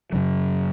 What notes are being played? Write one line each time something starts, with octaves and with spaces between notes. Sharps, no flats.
F#2 C#3 F#3